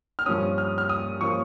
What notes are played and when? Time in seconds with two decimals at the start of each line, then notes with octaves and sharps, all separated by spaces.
0.19 F6
0.26 G2 F3 A#3 C#4 D#6
0.58 F6
0.78 F6
0.89 D#6
1.21 F3 A#3 C#4 C#6